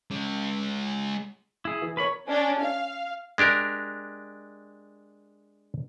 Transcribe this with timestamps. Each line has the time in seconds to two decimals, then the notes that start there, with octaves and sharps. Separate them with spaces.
0.11 G#3 C#4
1.65 E4 G#4
1.82 E3
1.97 A#4 B4 C#5 B5
2.27 C#4 D4
2.61 F5
3.38 G#3 D4 G4 A#4